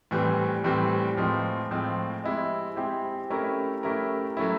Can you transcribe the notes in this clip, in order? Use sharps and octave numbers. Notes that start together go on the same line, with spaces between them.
A2 E3 G3 C4
A2 E3 G3 C4
A2 F3 G#3 C4
A2 F3 G#3 C4
G#3 C4 E4 G4
G#3 C4 E4 G4
A3 C#4 E4 G4 A#4
A3 C#4 E4 G4 A#4
F#3 A3 C#4 E4